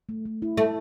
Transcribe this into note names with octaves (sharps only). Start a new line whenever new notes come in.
A3
A3
E4
A3 A4